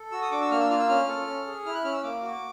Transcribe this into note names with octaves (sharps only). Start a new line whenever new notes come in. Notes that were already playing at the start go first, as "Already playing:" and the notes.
Already playing: A4
F#4 E6
D#6
D4 D6
E6
A#3 F6
E6
F4 F6
E6
C#4 F6
A4
C#4
G#4
E4 F6
F#6
C#4 F6
E6
A#3 D6
F#4